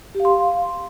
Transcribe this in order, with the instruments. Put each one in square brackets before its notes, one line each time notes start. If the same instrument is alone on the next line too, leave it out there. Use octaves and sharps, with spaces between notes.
[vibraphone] G4
F5
C6
F5